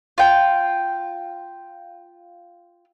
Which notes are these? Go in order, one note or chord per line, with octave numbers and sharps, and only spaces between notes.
F4 G5